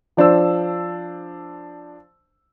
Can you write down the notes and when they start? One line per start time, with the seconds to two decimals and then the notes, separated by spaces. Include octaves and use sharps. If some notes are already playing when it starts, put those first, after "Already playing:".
0.17 F3 D4 C5 E6